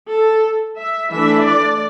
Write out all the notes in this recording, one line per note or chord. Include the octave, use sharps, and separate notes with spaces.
A4
E5
E3 A3 D4 E5
D5